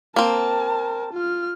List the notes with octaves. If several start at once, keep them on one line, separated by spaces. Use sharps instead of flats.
A#3 C4 A#4 A5
F4 F6